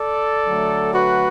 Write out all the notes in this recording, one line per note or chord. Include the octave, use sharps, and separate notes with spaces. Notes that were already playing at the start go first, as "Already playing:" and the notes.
Already playing: A4 D5
D3 F#3 A3
F#4 B4